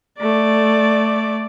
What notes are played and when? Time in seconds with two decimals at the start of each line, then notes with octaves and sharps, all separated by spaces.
0.19 A3 D5